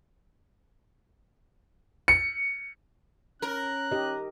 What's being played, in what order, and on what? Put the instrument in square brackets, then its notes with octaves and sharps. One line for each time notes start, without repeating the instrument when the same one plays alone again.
[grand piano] C#7
[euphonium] C#4 [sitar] A#4 [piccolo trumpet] F#6
[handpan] D#4 G4 D#5